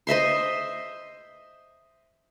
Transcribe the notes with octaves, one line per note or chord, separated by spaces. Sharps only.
C5 D#5 E5 C6